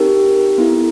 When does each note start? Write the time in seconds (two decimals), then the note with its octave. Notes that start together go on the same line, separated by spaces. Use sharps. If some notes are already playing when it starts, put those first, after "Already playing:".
Already playing: C4 D#4 G4 A#4
0.58 B3 E4 A4